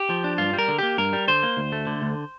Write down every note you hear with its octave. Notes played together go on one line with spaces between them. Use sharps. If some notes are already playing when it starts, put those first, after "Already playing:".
Already playing: G4
F3
D4
G2 F4
G3
A#4
D3
A#3 G4
G2 A#4
G3
D3 C5
A#3
D2
A3
D3
D2